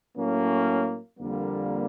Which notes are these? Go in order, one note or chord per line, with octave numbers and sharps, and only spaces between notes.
A2 F#3 A#3 C#4
F2 D3 G3 A#3